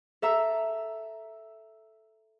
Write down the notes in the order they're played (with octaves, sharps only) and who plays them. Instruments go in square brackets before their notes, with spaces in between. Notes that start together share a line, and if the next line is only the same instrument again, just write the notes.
[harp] A4 E5 A#5 E6